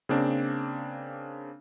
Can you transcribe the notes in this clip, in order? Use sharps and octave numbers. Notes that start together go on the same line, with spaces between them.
C#3 A#3 C4 D4